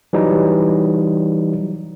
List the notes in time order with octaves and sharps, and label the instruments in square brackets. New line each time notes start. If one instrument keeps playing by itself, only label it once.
[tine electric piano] E3 F#3 G3 D#4